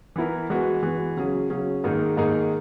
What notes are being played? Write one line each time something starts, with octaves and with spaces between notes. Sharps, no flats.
E3 B3 E4 A#4
E3 G#3 B3 F#4
E3 G#3 B3 F#4
C#3 F#3 C#4 G#4
C#3 F#3 C#4 G#4
G#2 D#3 A#3 D#4 G#4
G#2 D#3 A#3 D#4 G#4